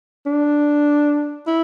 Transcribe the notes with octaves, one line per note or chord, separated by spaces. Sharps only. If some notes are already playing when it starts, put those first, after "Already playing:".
D4
E4